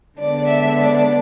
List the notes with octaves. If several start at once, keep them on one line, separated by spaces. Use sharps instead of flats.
D3 G#3 B3 D4 D5
E5
D5